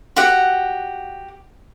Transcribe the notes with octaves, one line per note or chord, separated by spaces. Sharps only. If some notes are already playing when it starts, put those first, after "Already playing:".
F#4 G4 F#5